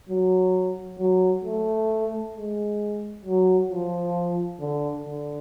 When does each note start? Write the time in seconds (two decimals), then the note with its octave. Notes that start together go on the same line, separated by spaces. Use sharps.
0.09 F#3
0.99 F#3
1.45 A3
2.35 G#3
3.25 F#3
3.71 F3
4.61 D3
5.06 D3